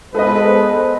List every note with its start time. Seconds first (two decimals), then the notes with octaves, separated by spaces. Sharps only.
0.14 G#3 B3 A4 B4 C5 D#5